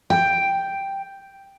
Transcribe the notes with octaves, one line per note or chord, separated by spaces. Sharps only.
G5